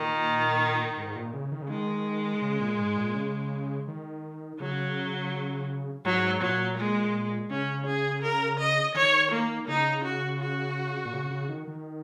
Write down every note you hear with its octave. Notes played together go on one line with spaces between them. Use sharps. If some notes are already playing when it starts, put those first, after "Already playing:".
Already playing: A#2 D#3
G#2
A#2
C#3
D#3
C#3
D#3 G#3
C#3
A#2
G#2
A#2
C#3
D#3
C#3 F#3
G#2 F#3
A#2 F#3
G#3
C#3 C#4
G#4
A#4
D#5
D#3 C#5
A#3
C#3 D#4
F#4
F#4
A#2
C#3
C#3
D#3
D#3